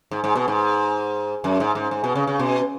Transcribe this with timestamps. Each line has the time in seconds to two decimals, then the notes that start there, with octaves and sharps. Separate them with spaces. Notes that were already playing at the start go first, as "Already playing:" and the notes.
0.11 G#2
0.24 G#2
0.35 B2
0.48 G#2
1.44 F#2
1.60 G#2
1.75 G#2
1.91 G#2
2.04 B2
2.15 C#3
2.27 C#3
2.39 B2